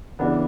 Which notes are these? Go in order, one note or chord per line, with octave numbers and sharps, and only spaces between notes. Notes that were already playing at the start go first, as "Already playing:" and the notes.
C#3 E3 B3 D4